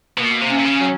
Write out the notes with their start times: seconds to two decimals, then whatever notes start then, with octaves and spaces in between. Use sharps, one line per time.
0.18 B2 A#3
0.41 C3
0.50 C#4
0.58 C3
0.65 C#3
0.80 F#3